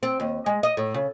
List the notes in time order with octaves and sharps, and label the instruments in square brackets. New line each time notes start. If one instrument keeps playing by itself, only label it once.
[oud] C4
D#2
G#3
D#5
A2
C#3